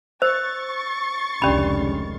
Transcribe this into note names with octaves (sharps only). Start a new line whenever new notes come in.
C5 C#6 E6 A6
F1 C#2 D#3 C#4 D4 G4 D5 B5